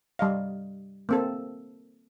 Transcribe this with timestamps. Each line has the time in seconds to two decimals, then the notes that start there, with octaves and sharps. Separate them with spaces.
0.19 G3 D#5 F5
1.09 A#3 C4 A4